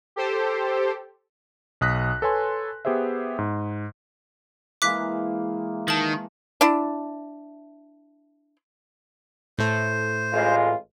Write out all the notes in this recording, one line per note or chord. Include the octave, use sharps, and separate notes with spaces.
G4 A4 C5
B1 D#6 F#6 A#6 B6
A4 B4 C#5 G#5 C6
B3 G4 G#4 C5 E5
G#2
E3 G#3 A#3 D6 F#6 B6
D#3 A5 F#7
D4 E4
A2 A3 C5
A1 G#3 F4